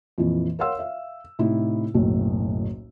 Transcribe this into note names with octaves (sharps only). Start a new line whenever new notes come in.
F2 A#2 E3
A#4 C#5 F5 F#5 C6 E6
E5 F5
A2 C3 D#4 E4
F#1 B1 A2